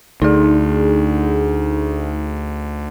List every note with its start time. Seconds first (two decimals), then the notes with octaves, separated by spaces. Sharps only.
0.22 D2 D#4 G#4